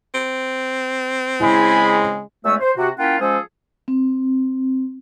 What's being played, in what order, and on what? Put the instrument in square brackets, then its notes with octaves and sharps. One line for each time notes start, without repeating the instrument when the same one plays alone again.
[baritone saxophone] C4
[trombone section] C#3 G#3 [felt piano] E4 [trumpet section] G#5 B5
[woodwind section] E2 G#3 A3 C#4 E6
C5
C3 F#4
A#3 C#4 E4 F4 F#5 G5
F3 G#3 C#4 G#4 A4 C5
[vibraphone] C4